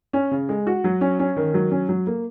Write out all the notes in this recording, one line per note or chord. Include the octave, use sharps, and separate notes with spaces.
C#4
C#3
G#3
F#4
F#3
C#4
C#4
D#3
F#3
C#4
F#3
A#3